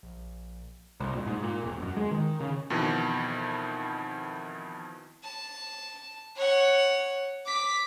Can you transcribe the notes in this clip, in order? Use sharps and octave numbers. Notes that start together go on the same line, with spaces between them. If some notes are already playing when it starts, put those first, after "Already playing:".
A#1
C2
A#2
G#2
A#2
E1
F#2
G#3
D#3
C#3
F2 B2 D#3 E3
A5
C#5 F#5
D6 B6